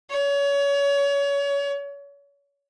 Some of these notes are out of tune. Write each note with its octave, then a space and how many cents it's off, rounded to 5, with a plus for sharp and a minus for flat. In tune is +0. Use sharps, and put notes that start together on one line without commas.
C#5 +30